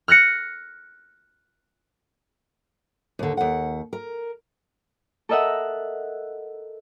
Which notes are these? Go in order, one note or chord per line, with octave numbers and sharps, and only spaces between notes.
F6 F#6 A#6 C#7
D#2 D3
D#2 F#5
A#4
A4 A#4 D#5 E5 F#5